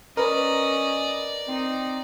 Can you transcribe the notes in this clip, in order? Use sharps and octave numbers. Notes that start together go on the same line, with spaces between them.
C#4 A#4 B4 D5 D#5
C4 D#4